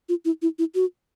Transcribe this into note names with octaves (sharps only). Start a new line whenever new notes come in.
F4
E4
E4
E4
F#4